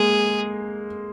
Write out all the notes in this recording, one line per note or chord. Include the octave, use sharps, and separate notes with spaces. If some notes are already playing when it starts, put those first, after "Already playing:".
Already playing: G#3 A#3 G#4